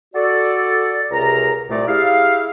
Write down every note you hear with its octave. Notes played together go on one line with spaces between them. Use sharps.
F#4 A4 D5
C#2 C3 A#4 A#5
C2 A#2 A3 D5
E4 G4 G#4 F5